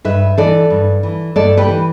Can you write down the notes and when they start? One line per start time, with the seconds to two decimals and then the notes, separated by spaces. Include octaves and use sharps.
0.04 G2 B4 E5
0.38 E3 A4 D5
0.70 G2
1.03 E3
1.36 G2 A4 D5
1.57 G4 B4
1.68 E3